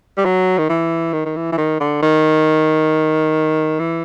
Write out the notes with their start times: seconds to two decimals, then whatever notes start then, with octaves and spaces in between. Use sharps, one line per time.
0.17 G3
0.25 F#3
0.58 D#3
0.69 E3
1.13 D#3
1.25 D#3
1.36 E3
1.52 E3
1.58 D#3
1.80 D3
2.02 D#3
3.79 E3